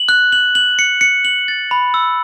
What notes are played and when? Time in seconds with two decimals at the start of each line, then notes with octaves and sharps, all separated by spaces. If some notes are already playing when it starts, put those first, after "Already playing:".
Already playing: F#7
0.09 F#6
0.32 F#7
0.55 F#7
0.79 C#7
1.01 C#7
1.25 F#7
1.48 A6
1.71 B5
1.94 E6